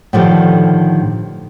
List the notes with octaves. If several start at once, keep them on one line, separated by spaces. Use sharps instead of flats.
A2 D3 D#3 F3 G4